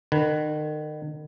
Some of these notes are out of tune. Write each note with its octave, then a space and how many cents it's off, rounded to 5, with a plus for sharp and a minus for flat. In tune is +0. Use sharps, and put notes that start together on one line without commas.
D#3 -40 B4 +0